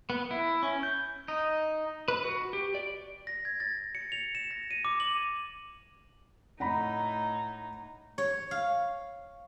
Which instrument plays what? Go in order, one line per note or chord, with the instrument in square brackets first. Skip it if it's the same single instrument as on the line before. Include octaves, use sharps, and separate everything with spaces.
[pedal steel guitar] B3
E4
C#4
G6
D#4
B4
F#4
G4
D5
[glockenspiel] A#6
G#6
A6
C#7
F7
E7
A#6
D#7
D6
F#7
[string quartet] A2 D#4 [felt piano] F#5 A#5 B5
[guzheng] C#5
F5